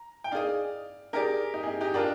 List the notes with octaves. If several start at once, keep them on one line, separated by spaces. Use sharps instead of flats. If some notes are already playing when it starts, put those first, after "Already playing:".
Already playing: A#5
G5
D#4 G#4 D5 D#5 F5
D#4 G4 G#4 A#4 D5
D#4 G4
G#4
D#4 G4
D#4 G4
D4 F4 A#4 D5 G5 A#5